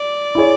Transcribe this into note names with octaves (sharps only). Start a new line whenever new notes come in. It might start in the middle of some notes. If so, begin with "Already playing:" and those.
Already playing: D5
E4 G#4 C#5